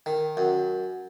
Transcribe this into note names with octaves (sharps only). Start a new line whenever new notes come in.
D#3
F#2